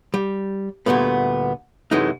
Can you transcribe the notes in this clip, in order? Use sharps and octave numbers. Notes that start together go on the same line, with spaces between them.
G3
D2 A#2 G3 A3 B3
F#2 C3 E3 G#3 A3 D#4